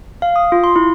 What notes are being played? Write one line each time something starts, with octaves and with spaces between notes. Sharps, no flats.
F5
D#6
F4
C6
E4